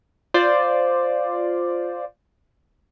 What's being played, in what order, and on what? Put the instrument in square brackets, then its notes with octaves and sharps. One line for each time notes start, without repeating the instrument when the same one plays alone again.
[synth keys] F4 C5 D5